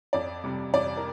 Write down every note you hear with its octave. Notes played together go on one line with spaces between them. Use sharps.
F2 D5
C3 G3
F2 D5
A#4